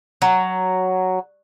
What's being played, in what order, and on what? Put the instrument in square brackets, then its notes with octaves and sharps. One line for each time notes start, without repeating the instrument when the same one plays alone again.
[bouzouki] F#3